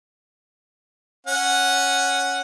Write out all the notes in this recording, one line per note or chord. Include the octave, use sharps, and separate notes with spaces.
C#4 F#5